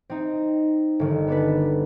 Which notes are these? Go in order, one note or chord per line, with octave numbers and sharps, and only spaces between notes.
C4 D#4
G1 D#3
B3 D4 B4